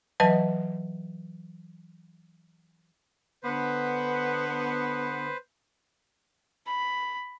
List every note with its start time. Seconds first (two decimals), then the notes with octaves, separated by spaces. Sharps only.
0.20 E3 F#3 B4 D#5 A5
3.43 D3 B3 B4 C5
6.67 B5